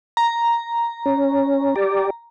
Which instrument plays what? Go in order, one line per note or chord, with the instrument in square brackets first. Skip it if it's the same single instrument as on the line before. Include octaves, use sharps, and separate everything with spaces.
[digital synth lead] A#5
[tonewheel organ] C#4
G4 D5